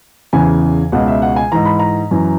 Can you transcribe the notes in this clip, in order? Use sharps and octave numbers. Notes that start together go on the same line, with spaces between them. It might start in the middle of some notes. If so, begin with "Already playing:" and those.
E2 C#3 E3 G#5
C#2 B2 F#5
E5
F#5
G#5
G#2 E3 A#5
B5
A#5
F#2 E3